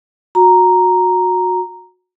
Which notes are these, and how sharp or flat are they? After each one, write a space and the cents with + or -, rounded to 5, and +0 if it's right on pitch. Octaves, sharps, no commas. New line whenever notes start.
F#4 -25 A#5 +0